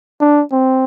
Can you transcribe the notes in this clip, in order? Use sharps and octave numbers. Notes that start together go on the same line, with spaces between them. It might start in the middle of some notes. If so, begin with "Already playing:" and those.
D4
C4